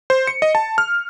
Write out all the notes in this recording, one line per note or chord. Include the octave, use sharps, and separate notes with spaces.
C5
C#7
D#5
A5
F6